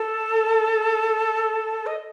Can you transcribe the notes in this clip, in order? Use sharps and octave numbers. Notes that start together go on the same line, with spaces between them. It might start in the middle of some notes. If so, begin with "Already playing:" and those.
Already playing: A4
D#5